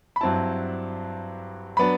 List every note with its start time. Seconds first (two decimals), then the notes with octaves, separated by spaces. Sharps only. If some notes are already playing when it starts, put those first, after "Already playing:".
0.16 B5
0.21 G2 F#3 C4 E4 A5
1.77 F#3 B3 D4 B5